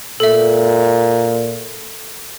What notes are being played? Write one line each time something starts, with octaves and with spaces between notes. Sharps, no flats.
A#2 A4 E5